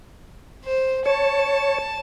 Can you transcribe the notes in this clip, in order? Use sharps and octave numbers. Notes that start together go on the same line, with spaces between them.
C5
C#5 A5